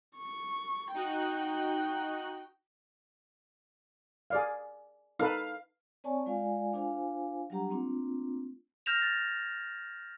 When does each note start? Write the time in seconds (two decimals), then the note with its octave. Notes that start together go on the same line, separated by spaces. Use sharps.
0.19 C#6
0.94 D#4 F#4 G5 F#6
4.30 G#4 D5 F5
5.19 D#4 A4 B4 F5
6.04 C4 C#5 D5 G#5 A5 C#6
6.26 G#3 F4 D5 F5 G#5
6.73 D4 F4 C5 F5 G#5
7.50 F#3 G3 D4 G4 F#5 A#5
7.70 A3 A#3 C4 D4 F4
8.86 F6 G6 A#6 E7 F7
9.02 A6